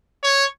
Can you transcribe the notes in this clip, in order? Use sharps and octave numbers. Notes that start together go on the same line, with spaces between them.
C#5